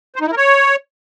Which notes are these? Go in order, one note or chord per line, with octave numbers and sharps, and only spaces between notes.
C5
D#4
E4
A#4
C#5